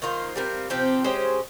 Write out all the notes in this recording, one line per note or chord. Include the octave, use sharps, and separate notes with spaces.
D#3 A#3 F4 C5
G3 C4 F4 A#4
C3 F3 C4 G4
G#3 C#4 G4 C5